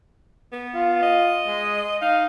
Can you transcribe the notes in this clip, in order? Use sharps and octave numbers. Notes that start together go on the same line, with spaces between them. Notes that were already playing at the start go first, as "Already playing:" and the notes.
B3
F4
D#5
G#3
D#4 F5